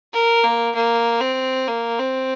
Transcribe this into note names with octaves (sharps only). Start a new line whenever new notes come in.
A#4
A#3
A#3
C4
A#3
C4